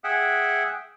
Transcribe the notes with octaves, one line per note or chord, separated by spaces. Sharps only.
G#4 E5 F#5 G5